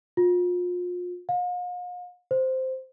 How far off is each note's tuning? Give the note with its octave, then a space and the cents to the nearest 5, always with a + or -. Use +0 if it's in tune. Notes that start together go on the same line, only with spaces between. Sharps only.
F4 +35
F5 +45
C5 -5